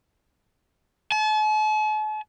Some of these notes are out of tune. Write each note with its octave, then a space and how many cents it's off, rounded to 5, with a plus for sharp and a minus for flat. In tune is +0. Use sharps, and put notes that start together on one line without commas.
A5 -45